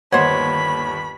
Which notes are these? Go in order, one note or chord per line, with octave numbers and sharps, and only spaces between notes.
G1 D#2 C5 C#5 D#5 F#5 B5 G#6